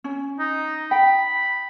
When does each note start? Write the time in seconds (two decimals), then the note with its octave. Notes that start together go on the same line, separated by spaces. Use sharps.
0.04 C#4
0.39 D#4
0.91 G5 B5